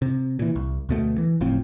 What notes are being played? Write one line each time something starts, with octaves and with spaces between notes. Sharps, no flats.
C3
A#2 E3
C2
D2 B2 A3
E3
F#1 A2 F3 C4